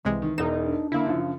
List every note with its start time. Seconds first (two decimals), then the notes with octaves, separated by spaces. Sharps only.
0.05 C2 C3 E3 G#3
0.22 D#3
0.38 E1 E2 D#4 E7
0.66 D4
0.92 D3 A#3 E4
1.06 F#2 C#3 F3